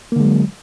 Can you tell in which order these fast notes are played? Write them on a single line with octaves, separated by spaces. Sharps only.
A#3 D3 G#3 F#3